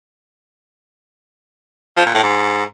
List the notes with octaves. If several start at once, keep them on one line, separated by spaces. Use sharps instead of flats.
F3
A#2
A2
G#2